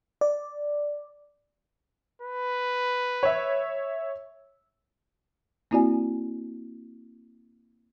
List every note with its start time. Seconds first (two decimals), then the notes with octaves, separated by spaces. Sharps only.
0.21 D5
2.22 B4
3.23 C#5 E5
5.71 A#3 C4 E4 F#4 D5 G#5